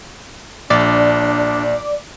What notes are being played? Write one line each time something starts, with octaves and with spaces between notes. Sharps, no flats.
A#1 D4 D5